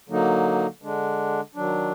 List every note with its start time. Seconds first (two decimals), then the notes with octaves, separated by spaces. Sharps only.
0.09 D3 F#3 A#3 D#4
0.82 D3 G#3 D4
1.55 D#3 F#3 D4